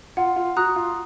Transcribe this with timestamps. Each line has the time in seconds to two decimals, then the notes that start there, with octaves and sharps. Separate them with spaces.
0.17 F4 F#5
0.36 F4
0.57 F#4 A#5 D#6 F#6
0.76 F4